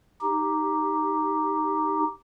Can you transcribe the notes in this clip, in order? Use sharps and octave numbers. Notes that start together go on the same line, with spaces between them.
D#4 G4